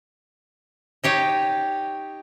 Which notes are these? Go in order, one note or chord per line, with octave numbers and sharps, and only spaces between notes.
D#4 G4 C#5